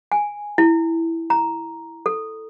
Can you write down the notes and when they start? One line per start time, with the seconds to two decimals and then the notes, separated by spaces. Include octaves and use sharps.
0.12 G#5
0.58 E4
1.30 A#5
2.06 A4